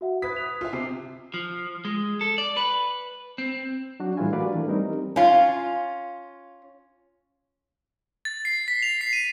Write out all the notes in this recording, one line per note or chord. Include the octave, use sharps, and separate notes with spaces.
F#4 E5 F#5
B4 D#6 G#6 B6
D#6 F#6 F7
F4 E5
C3 C7
F3
G#3
A4
D5
B4
C4
F#3 D4 F#4
A2 E3 G3 E4 F4 G#5
D4 F#4 A#4 B4 D5 F5
E3 A3
G3 C4 D#4 A#4
C#4 F4
A6
C7
B6
F7
C7
D#7